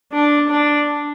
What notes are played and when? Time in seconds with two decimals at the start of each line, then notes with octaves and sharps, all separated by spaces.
0.12 D4
0.49 D4